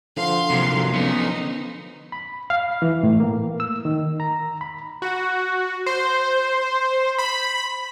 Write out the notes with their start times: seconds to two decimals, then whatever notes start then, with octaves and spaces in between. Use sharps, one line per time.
0.17 D3 F3 F5 C6
0.50 C3 F#3 A#3
0.94 B3 C#4 D#4
2.12 B5
2.50 F5
2.82 E3
3.03 A2
3.20 A#3
3.60 E6
3.85 D#3
4.20 A#5
4.61 B5
5.02 F#4
5.86 C5
7.19 B5